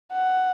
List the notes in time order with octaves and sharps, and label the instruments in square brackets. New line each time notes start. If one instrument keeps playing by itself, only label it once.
[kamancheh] F#5